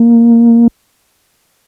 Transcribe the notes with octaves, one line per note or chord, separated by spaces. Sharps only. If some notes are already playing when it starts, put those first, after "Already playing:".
Already playing: A#3